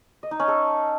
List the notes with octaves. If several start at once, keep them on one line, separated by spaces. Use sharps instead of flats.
D#5
D#4
C#4
A4